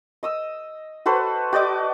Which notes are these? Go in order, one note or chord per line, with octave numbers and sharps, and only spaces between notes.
D#5 D#6 E6
F#4 A4 B4 C5
F#4 D5 D#5 D6